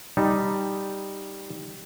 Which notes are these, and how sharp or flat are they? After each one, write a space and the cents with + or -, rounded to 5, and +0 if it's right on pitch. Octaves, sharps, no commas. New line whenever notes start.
G3 +0 D#4 +0 A5 +0